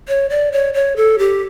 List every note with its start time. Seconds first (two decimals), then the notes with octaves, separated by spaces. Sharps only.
0.08 C#5
0.30 D5
0.52 C#5
0.74 C#5
0.96 A4
1.18 G4